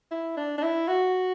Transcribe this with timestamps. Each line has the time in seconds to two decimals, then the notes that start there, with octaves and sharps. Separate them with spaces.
0.11 E4
0.37 D4
0.58 D4
0.63 E4
0.88 F#4